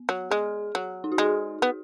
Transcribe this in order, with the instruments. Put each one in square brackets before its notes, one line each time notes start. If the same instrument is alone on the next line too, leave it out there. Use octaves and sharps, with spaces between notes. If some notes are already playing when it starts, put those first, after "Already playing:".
Already playing: [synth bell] B3
[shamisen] F#3
[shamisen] G#3 [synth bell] G#4
[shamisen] F#3
[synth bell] D#4
F#4
[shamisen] G#3 [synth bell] G#4
[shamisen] B3